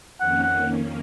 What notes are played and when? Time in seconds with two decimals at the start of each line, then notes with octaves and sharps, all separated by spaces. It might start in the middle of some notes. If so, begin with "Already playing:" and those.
0.20 F2 D#3 A#3 C#4 F#5
0.43 F#5